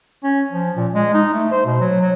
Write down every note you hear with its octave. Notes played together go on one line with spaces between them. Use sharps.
C#4
F3
A#2
G#3
D#4
A3
C5
B2
F#3
F#3